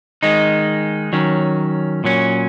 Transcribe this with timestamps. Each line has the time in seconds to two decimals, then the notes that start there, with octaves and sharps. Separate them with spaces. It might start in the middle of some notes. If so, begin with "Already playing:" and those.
0.23 D#3 G#3 D#4
1.13 D#3 F#3 C#4
2.04 A#2 F#3 C#4